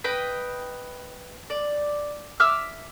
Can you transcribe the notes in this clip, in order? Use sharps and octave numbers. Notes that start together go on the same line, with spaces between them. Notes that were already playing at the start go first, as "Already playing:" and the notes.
B4 D#5 G5 B5
D5
E5 D6 E6 F6